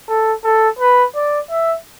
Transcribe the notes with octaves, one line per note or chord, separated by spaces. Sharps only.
A4
A4
B4
D5
E5